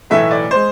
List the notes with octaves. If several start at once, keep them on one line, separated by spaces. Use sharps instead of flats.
B1 A2 E3 A3 E5
D5
G#3 C5